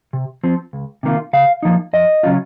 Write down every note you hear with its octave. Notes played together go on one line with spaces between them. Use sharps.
C3
F3 C4
C#2
C3 D#3 A#3 F4
C#3 F5
F3 A#3 D#4
F2 D#5
C#3 F#3 C#4 F4